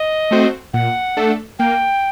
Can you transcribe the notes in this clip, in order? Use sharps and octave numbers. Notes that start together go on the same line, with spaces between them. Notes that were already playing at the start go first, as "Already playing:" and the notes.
Already playing: D#5
A3 C4 F#4 C5
A#2 F#5
A3 D4 A4
A#3 G5